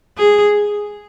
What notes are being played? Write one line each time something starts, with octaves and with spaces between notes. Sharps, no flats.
G#4